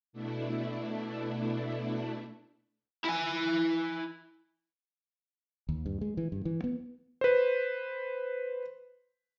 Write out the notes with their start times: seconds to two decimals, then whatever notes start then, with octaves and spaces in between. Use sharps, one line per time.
0.13 B2 A3 D4 E4
3.05 E4 G#5
5.69 D#2
5.86 G2
6.01 G#3
6.17 E3
6.32 G2
6.45 E3
6.64 B3
7.21 B4 C5